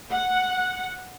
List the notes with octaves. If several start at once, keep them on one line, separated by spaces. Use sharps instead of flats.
F#5